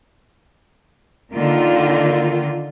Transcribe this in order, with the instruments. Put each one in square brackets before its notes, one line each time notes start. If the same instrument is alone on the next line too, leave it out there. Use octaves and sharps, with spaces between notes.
[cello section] D3 D#3 A#3 F4